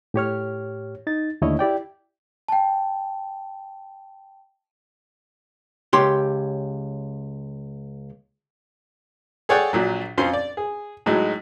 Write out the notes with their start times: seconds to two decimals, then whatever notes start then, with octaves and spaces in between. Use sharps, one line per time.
0.14 A2 G4 C#5 F6
1.07 D#4 A6
1.42 D#2 D3 A3 E4 C#5 D#5
1.59 E4 G4 D5 G5
2.48 G5 A5
5.93 C#2 G4 C#5 C6
9.49 G#4 A4 C#5 D5 F#5 G5
9.73 A#1 A#2 F#3
10.18 F2 F3 C#4 C6
10.33 D5
10.57 G#4
11.06 A2 F#3 G#3 D#4